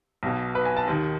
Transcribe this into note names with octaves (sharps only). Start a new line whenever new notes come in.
B1 B2
B4
G#5
A5
D#2 D#3